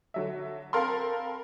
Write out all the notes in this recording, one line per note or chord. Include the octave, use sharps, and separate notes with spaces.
D3 F#3 E5
C4 A4 A#4 F5 B5 C6